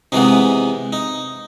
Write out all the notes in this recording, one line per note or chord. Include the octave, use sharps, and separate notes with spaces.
C3 E3 G#3 B3 D#4
D#4